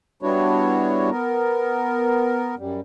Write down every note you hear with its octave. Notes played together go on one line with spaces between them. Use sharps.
G3 B3 D4 E4 F#4 C#5
B3 A#4
F#2 G3